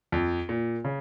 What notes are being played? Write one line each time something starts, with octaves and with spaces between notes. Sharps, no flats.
F2
A#2
C#3